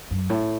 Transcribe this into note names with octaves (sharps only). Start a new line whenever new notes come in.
F#2
A2